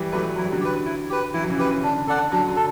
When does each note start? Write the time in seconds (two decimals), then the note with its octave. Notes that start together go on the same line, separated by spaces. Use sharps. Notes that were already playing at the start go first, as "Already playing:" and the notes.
Already playing: E3 G3
0.12 F#3 A3 G4 B4
0.36 F#3 E4
0.45 G3
0.52 D3 F#3
0.61 G4 B4
0.85 E4
1.10 G4 B4
1.34 E3 E4
1.42 F#3
1.50 C#3 E3
1.58 G4 B4
1.83 D3 D4
2.07 D3 A4 D5 F#5
2.32 D3 F#3 D4
2.48 D3 F#3
2.56 A4